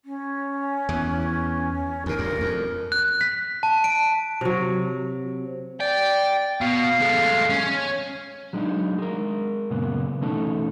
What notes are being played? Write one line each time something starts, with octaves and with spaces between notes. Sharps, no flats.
C#4
E2 E3
D#2 B2 A#4
D2 G2
F2
F#6
B6
A5
D7
C3 F#3
D5 G5
B2 F5
G#3 A3
C#4
F#3 G#3 D4 D#4
G#3 A#4
F#2 A#2 C#3 B3
B2 E3 A3 C#4 D#4 A4